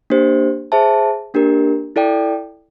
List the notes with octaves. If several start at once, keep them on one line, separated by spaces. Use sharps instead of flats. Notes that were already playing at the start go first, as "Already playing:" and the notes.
A#3 D4 G4 C5
G#4 C5 E5 A5
A#3 D4 G4 A#4
E4 A4 D5 G5